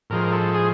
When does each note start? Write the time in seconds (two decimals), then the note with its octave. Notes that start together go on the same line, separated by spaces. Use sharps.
0.10 A2 F3 G#3 A#4
0.32 A4
0.54 G#4